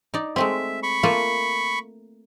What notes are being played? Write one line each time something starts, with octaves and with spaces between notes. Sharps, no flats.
D#4 D5
G#3 A3 C4 E5
B5 C#6
A3 A#3 F4